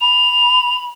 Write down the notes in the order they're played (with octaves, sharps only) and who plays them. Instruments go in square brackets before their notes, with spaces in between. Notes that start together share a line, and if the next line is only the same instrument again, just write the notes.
[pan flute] B5 [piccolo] F7